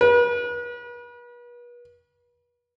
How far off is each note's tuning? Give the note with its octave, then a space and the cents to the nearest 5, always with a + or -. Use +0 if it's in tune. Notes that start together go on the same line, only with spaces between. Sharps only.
B4 -40